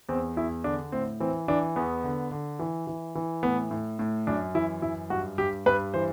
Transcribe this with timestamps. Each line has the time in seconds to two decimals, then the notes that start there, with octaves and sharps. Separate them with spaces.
0.09 E2 C4
0.37 E2 E4
0.64 D3 D4
0.92 A2 C4
1.20 E3 C4
1.48 E3 D4
1.76 E2 B3
2.04 D3
2.32 D3
2.59 E3
2.87 E3
3.15 E3
3.43 A2 B3
3.71 A2
3.99 A2
4.27 F#2 D4
4.55 E3 E4
4.82 F#2 E4
5.10 G2 F#4
5.38 G2 G4
5.66 G2 B4
5.94 E3 C5